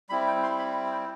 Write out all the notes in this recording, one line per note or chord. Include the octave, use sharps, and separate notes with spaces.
G3 C4 E4 B5
G5
C6
B5
G5